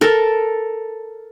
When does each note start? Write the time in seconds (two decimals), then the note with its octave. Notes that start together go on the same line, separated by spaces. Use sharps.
0.01 A4 A#4